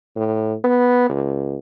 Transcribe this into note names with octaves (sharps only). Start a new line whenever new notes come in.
A2
B3
C#2